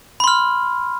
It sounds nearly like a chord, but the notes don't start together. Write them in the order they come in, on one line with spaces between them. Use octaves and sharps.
B5 C6 F6